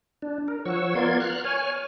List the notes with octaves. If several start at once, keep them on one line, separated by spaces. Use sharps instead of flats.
D4
A#4
F3 C#5 F#5 C#6 E6
B3 F4 A#4 D5 C6 G#6
F6 F#6
C#5 G#5 F6